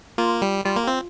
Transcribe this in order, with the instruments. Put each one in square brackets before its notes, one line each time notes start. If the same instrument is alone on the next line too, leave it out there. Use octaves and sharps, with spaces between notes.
[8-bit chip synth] A#3 [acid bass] F4
[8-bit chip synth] G3
[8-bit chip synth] G3 [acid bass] F4
[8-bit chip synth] A#3
[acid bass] G4
[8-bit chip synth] C4 [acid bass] F4